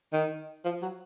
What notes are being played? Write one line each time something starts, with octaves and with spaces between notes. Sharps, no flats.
D#3
F3
F#3